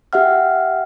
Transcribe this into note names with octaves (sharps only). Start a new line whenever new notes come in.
G4 E5 F#5 F6